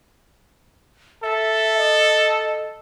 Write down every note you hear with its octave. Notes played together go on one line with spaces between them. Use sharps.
A4 E5
D#5